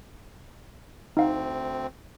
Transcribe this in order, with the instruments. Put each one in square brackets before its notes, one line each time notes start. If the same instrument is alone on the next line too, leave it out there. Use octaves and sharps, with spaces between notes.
[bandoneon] D2 C4 [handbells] D#4 F5 F#5